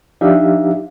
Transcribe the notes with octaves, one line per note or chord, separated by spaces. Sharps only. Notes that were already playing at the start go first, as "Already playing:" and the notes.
F3 D4 D#4 G4 E5 F5